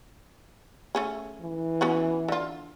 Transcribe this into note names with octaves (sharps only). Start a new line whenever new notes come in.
A3 C#4 G#4
E3
B3 C#4 F#4
D3 F4